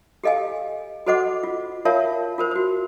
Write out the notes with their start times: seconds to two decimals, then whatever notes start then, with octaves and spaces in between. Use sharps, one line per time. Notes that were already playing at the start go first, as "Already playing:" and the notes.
0.24 G4 A4 D#5 F5 G#5
1.06 F#4 A4 C5 D#5 F#5 D6
1.43 F4
1.85 F4 A#4 C#5 E5 F5 A5
2.38 F4 A#4 C5
2.51 F#4 C5